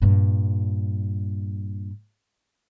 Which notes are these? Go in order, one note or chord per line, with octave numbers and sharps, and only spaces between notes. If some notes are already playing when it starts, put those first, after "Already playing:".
G2 A#2